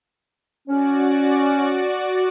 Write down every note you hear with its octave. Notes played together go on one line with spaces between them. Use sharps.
C#4 F#4 D5